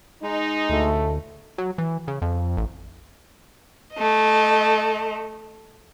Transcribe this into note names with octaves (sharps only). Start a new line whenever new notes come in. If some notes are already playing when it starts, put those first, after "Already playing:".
G#3 D#4
D2 A2 A3
F#3
E3
C#3
F2
A1
A3 D#5